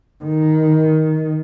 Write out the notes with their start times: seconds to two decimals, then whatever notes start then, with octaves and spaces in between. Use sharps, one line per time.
0.24 D#3